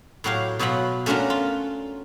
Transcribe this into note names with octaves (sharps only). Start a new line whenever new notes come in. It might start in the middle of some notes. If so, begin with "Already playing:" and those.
A2 F#3 F#4 G4 F5
B2 F#3 F4 F#4 B5
A3 C#4 D4 F4 F#4 A#4
F4